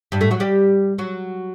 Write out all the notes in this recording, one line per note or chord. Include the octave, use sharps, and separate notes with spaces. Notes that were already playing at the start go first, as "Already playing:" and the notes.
G2 G3
A2 A3
F#3 F#4
G3 G4
F#3 F#4